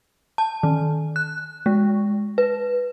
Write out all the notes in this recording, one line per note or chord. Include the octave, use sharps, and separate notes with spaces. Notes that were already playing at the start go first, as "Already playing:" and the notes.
A5
D#3
F#6
G#3
B4